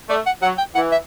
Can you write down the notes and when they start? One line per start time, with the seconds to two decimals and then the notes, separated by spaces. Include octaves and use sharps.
0.09 A3 D5
0.26 F#5
0.42 F#3 F#5
0.58 G5
0.75 E3 F#5
0.92 E5